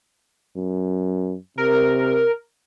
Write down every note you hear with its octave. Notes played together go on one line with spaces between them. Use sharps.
F#2
C3 A#4